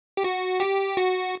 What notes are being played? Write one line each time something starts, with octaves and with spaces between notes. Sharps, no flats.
G4
F#4
G4
F#4